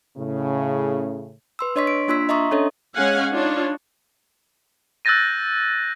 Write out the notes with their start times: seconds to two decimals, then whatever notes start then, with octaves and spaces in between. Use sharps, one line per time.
0.18 A2 C#3
1.59 B4 C6 E6
1.76 D4 C#5 D#5 C6 C#6 B6
1.87 D7
2.08 A#3 D4 F4 C6 E6 B6
2.29 D#5 E5 A#5 C6 C#6 D#6
2.51 C#4 D4 A4 C#5 D#5
2.96 G#3 C#4 C#5 F5 F#5 G#5
3.33 D4 D#4 F4 C#5
5.05 E6 F#6 G6 A6 A#6 D#7